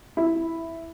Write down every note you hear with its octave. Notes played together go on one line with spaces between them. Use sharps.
E4